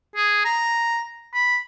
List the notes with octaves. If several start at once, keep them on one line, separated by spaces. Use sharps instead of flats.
G#4
A#5
B5